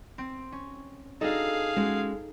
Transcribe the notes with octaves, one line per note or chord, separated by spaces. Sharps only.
C4
C#4
D4 D#4 F#4 G#4 A4 D#5 F5
G#3 C#4 F#4